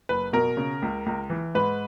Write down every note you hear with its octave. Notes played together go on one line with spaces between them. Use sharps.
F#1 B4
B2 A#4
C#3
C#2
C#2
E3
G#2 B4